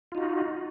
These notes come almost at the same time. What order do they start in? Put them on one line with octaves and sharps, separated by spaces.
F4 D#4 F#4